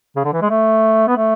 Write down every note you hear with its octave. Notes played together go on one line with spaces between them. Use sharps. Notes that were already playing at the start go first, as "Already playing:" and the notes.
C#3
D3
E3
G#3
A3
B3
A3